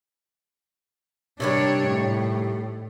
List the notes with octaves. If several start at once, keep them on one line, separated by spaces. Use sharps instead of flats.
C3 D#3 G3 D4 C#5
A2